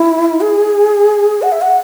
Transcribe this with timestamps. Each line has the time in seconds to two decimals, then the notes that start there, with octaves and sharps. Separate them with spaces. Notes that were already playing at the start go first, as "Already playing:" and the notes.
Already playing: E4
0.41 G#4
1.42 F#5
1.52 E5
1.61 F#5